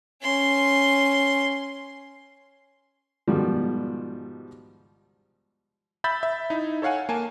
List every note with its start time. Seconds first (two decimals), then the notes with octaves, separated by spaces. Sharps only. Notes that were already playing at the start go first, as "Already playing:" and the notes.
0.22 C#4 C6
3.28 G#2 B2 D#3 F3 G3
6.04 E5 B5 E6 G6 A6 B6
6.23 E5
6.50 D#4 E4
6.82 A4 C#5 F5 F#5 G#5
7.09 A#3 G#5 A5